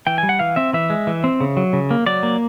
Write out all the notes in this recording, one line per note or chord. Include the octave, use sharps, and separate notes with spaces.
E3 G5
G3 G#5
F#5
E3 F5
C4 E5
E3 E5
G#3
E3
C4
C#3
F#3
C#3
A#3
F#3 D5
A#3